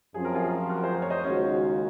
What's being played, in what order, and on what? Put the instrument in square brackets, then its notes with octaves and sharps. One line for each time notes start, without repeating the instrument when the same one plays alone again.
[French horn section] F#2 F3 C4 [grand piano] G#4
[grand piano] A#4
F4 G#4
F#4 A#4
G#4 C5
C5
C#5
C5 D#5
[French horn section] D#2 C#3 G#3 D#4 F#4 [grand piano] C#4 F4